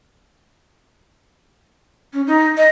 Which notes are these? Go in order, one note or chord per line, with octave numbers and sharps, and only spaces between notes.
C#4
D#4
D#5